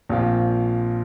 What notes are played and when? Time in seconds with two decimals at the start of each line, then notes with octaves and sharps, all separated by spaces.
0.09 A#1 A#2 F3 C4 F4